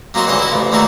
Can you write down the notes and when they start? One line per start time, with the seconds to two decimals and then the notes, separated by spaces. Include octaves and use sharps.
0.14 F#3 A#3 C4 D#4 F#4 C5
0.27 C#2 D3 E3 C4 D#5
0.39 E4 F#4
0.51 A1 F3
0.72 E2 D3 D#3 A3 A#3 F#4